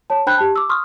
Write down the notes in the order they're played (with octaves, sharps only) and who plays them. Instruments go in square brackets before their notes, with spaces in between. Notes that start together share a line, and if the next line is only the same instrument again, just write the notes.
[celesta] C#5 A5
D4 C5 G5 B5 F#6 G6
G4 A5
D6 E6
C6 C#6 D#6 F6